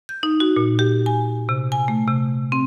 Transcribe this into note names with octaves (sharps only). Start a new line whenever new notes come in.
G6
D#4
F#4
A#2
G4
G#5
C3
G#5
A3
C3
C4